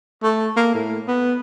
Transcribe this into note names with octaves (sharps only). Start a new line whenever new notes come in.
A3
A#3
A2
B3